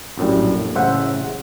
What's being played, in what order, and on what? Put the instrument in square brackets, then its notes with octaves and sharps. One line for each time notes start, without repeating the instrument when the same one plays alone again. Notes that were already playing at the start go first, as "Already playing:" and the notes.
[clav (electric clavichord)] A#1 F#2 A2 G3
A1 C#3 C5 E5 F#5